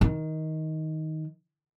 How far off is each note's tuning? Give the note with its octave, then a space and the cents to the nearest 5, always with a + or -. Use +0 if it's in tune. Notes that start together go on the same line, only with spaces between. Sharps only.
D#3 +15